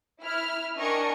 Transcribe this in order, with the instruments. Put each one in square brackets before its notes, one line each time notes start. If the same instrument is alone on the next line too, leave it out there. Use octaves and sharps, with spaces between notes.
[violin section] E4 F6
D4 A#4 D#5 G5 G#5 C#6